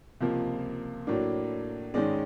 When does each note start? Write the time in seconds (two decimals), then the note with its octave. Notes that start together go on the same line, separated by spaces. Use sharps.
0.21 C#2 C3 F3 A#3
1.07 A2 F#3 A#3 D4
1.94 G#2 D#3 G#3 C#4 D5